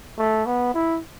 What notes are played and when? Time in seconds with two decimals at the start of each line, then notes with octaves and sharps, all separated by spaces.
0.18 A3
0.46 B3
0.74 E4